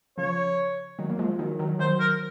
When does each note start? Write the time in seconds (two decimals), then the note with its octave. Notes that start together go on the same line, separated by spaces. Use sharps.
0.18 C#3 F3 C#5
0.99 D#3 F#3
1.10 A#3
1.19 F3 G#3
1.39 D#3 F#3
1.59 D#3 F#3
1.79 D#3 F#3 C5
2.00 A#4